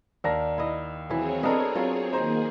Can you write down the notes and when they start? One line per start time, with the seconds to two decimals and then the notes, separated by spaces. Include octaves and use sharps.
0.24 D#2 D4 A#4 A#6
0.58 E4 D#5
1.10 E3 F#3 C4 G#4 C#5
1.43 B3 D4 A4 A#4 D#5
1.75 F#3 F4
2.12 D#3 A#3 D#4 G#4 C5 A#5